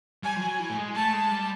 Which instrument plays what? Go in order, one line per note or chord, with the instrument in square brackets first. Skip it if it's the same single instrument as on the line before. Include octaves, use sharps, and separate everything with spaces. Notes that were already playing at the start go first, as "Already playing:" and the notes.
[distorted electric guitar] G3 [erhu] G#5
[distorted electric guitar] F3
F#3
E3
A3
G#3
[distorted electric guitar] A3 [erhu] A5
[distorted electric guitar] G#3
G3